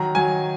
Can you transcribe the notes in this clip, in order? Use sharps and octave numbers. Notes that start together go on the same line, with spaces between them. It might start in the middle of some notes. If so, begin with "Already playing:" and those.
Already playing: D#3 F#3 A#5
F#3 G#5